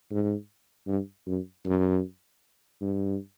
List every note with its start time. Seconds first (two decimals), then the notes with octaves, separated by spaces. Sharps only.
0.10 G#2
0.87 G2
1.27 F#2
1.65 F#2
2.81 G2